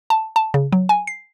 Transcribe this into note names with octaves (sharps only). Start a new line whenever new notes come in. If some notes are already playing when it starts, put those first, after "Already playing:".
A5
A5
C#3
F#3
G#5
C7